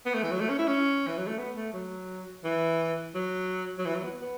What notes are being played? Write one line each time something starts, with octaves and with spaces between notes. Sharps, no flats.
B3
A3
E3
F#3
A3
C#4
E4
C#4
E3
F#3
A3
B3
A3
F#3
E3
F#3
F#3
E3
F#3
B3
B3